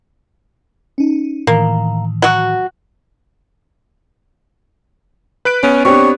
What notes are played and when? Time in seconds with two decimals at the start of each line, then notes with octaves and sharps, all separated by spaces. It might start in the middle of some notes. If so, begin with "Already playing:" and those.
0.98 C#4 D#4
1.47 A2 D#3 E3 A#3
2.22 F#3 F#4
5.45 B4 F#6 D7
5.63 B3 C#4
5.85 C4 D4 G4 C#5